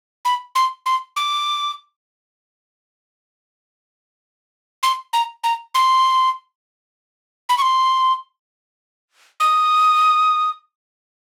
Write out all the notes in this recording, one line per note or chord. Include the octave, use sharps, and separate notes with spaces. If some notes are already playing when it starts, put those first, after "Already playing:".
B5
C6
C6
D6
C6
A#5
A#5
C6
B5
C#6
C6
D#6